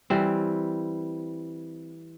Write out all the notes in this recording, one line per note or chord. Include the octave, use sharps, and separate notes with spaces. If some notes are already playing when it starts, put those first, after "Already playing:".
E3 G3 C4